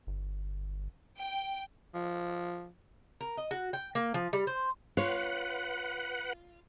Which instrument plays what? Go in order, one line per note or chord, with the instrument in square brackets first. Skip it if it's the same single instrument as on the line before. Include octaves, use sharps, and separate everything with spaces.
[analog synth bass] G1
[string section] G5
[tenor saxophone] F3
[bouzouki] A#4
D#5
F#4
G5
A#3
F3
G3
C5
[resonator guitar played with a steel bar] F4 [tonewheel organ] B4 F#5 [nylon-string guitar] C#5